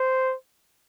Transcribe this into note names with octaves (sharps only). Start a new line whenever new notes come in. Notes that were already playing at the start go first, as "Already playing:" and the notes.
Already playing: C5